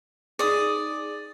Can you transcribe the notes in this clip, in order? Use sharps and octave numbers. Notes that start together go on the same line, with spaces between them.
D#4 G#4 D5 D#6